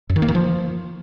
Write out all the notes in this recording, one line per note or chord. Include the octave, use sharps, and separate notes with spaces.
F#2
D#3
A#3
D#3
F3